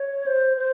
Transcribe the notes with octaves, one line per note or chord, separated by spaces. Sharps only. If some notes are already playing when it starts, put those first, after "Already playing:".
Already playing: C#5
C5
C5